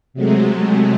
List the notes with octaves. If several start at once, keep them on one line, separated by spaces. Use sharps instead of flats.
C3 F#3 G#3 A3